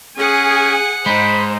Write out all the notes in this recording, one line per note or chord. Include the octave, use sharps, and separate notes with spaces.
C#4 G#4 F#5 G#5
G#3 D#4 C5 B5